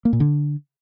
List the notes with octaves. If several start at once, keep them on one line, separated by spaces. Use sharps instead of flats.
A#3
A#2
D3